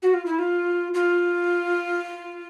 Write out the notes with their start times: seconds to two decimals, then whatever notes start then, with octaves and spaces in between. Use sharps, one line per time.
0.02 F#4
0.14 F4
0.26 E4
0.39 F4
0.94 F4